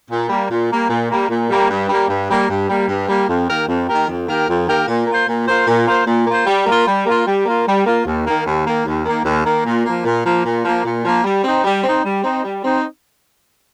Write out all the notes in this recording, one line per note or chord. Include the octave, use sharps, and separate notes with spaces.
A#2
G3 A#3
A#2
G3 A#3
A#2
G3 A#3
A#2
G3 A#3
G2
G3 A#3
G2
G3 A#3
G2
G3 A#3
G2
G3 A#3
F2
D#3 A#3 G4 A#4
F2
D#3 A#3 G4 A#4
F2
D#3 A#3 G4 A#4
F2
D#3 A#3 G4 A#4
A#2
A#3 F4 C5
A#2
A#3 F4 C5
A#2
A#3 F4 C5
A#2
A#3 F4 C5
G3
A#3 F4
G3
A#3 F4
G3
A#3 F4
G3
A#3 F4
D#2
D#3 A#3
D#2
D#3 A#3
D#2
D#3 A#3
D#2
D#3 A#3
A#2
F3 A#3
A#2
F3 A#3
A#2
F3 A#3
A#2
F3 A#3
G3
C4 D#4
G3
C4 D#4
G3
C4 D#4
G3
C4 D#4